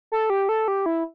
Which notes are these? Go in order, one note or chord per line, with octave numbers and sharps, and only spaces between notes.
A4
G4
A4
G4
E4